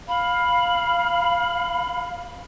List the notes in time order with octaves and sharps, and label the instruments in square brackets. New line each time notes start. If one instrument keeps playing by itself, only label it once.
[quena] F5 [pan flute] B5